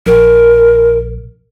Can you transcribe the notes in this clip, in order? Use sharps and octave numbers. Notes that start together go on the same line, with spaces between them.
A#1 A#4